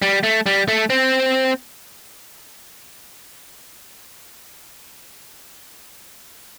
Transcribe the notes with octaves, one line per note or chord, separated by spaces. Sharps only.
G3
A3
G3
A3
C4